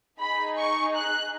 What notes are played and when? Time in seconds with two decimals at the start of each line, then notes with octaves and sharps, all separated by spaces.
0.20 D#4 G#4 B5
0.58 C#6
0.95 F#6